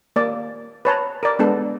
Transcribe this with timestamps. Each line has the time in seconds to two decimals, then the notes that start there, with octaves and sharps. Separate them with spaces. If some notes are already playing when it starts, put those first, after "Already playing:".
0.16 A#3 D5
0.85 B4 C#5 A5 A#5
1.23 A#4 D5
1.39 G#3 B3 D4 A4